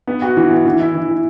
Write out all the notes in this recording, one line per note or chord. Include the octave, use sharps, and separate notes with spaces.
B3
F#4
E3
B3
E3
E4
E3
E4